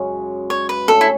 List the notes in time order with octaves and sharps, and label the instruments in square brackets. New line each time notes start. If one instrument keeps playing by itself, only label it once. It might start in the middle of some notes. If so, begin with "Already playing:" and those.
Already playing: [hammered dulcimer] F#2 C#3 G#3
[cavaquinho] C#5
B4
[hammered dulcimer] D3 A3 C#4 G#4 [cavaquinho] A4
[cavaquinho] E4